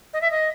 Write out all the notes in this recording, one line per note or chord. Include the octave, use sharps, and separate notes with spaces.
D#5
E5
D#5